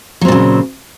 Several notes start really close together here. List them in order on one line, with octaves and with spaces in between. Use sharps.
F#3 C4 A#2 C#3